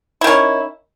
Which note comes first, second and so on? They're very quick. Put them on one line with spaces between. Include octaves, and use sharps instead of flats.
E4 D#3 C#4